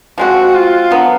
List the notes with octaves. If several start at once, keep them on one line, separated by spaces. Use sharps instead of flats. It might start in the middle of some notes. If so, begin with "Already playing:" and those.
F3 G#3 C4 F#4
F4
D3 F#3 B3